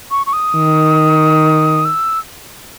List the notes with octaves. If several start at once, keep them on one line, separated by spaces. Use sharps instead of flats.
C#6
C#6
D#6
D#3
E6